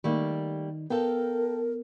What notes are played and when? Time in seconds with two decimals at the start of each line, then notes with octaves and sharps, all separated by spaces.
0.04 D#3 G3 A3 A#3 D#4
0.90 B3 A4 A#4 F5 G5